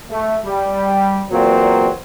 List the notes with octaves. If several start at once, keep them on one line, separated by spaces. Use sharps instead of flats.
A3
G3
E2 A#2 F#3 A#3 C4